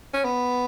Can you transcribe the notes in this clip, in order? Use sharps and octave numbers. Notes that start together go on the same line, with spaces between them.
C#4
B3